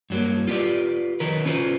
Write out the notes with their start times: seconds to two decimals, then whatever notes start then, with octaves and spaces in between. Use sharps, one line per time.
0.10 G2 F#3 A#3
0.48 F4 G4 B4 D5
1.20 D#3 F#3 A#4 B4
1.45 C#4 F4 B4 C5